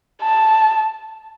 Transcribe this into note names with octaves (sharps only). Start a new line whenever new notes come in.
A5